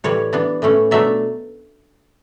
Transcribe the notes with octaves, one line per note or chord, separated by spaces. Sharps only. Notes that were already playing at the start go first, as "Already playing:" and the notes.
A2 E3 G3 C#5
E3 B3 D4
A2 E3 A3 C#4
B2 F#3 A3 D4 E5